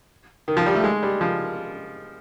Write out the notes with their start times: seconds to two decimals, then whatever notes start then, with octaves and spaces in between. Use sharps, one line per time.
0.48 D#3
0.57 F3
0.66 G3
0.75 A3
0.84 G#3
1.03 G3
1.21 F3